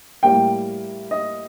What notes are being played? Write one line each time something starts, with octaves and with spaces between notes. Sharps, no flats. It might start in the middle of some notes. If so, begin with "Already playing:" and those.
A2 G3 A#3 G5
D#5